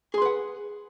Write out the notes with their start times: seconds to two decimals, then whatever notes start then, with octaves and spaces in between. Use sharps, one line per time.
0.14 G#4
0.18 C6
0.22 B4
0.25 F#5